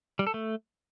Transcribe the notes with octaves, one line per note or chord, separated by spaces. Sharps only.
G3
A4
A3